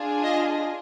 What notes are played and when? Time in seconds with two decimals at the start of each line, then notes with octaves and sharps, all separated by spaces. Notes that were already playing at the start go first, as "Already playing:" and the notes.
Already playing: D4 F4 G#4
0.24 D#5 F5